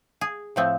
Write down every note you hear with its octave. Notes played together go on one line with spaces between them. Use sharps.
G#4
A2 F3 A3 C4